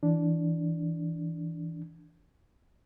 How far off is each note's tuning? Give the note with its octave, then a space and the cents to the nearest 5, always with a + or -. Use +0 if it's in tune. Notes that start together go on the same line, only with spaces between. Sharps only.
E3 -5 D4 -10